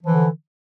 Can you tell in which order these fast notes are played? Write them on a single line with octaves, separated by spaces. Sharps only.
F3 E3 D3